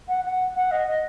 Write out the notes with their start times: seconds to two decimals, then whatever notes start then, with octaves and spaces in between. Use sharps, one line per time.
0.08 F#5
0.24 F#5
0.56 F#5
0.71 D#5
0.87 D#5